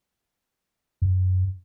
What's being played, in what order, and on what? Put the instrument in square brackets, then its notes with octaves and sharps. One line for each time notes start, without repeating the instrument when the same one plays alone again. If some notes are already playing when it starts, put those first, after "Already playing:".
[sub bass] F#2